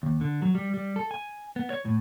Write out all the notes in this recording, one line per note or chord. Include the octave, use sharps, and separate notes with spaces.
D#2
D3
F#3
G3
G3
A4
G#5
B3
C#5
A2